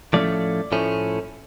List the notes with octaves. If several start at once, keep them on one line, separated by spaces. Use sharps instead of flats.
A2 F3 A3 C#4 D5
A2 F3 A3 C#4